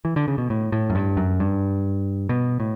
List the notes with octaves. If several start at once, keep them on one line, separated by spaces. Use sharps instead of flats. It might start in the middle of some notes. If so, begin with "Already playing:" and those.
E3
D3
C#3
B2
A2
A2
F#2
G2
F#2
G2
B2
A2